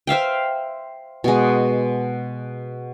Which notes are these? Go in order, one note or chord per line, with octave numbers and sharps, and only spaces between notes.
C5 E5 F5 G5
B2 G#3